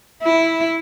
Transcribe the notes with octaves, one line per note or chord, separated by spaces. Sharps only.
E4